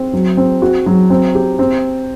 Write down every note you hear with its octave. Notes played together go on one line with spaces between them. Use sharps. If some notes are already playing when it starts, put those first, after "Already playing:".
Already playing: C4
F#3
C4
F#4
F#3
C4
G4
C4